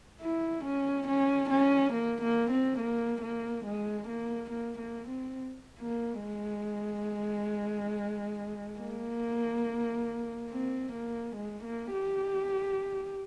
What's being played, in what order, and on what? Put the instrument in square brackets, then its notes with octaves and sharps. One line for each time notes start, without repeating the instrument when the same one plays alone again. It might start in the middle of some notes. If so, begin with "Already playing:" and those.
[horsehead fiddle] E4
C#4
C#4
C#4
A#3
A#3
C4
A#3
A#3
G#3
A#3
A#3
A#3
C4
A#3
G#3
A#3
C4
A#3
G#3
A#3
G4